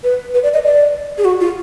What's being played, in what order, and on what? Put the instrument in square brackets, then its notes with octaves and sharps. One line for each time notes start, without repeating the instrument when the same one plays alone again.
[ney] B4
B4
D5
D#5
D5
G#4
F#4
F4